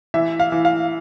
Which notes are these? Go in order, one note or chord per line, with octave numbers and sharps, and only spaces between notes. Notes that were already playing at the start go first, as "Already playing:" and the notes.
E3 E5
F5
E3
F5